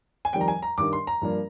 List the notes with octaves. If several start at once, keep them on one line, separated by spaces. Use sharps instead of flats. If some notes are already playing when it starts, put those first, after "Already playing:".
G#5
F2 D#3 G3 G5
A#5
G#5
A#5
G2 D#3 G3 D4 D6
C6
A#5
G2 F3 A#3 D4